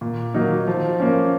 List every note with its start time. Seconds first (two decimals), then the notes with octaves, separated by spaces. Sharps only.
0.01 A#2
0.34 F#3 A#3 D#4
0.67 F3
1.00 A#3 C#4